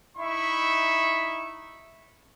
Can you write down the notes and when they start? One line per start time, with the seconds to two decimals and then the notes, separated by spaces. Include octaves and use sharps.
0.17 D#4 E4 E5 B5 C#6